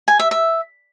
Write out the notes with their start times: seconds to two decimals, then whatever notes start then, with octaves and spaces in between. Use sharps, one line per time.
0.08 G#5
0.19 E5
0.31 E5